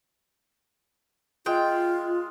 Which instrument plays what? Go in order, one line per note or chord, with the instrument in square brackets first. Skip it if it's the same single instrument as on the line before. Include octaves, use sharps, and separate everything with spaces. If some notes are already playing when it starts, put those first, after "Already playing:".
[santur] G#3 [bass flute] F4 [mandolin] G5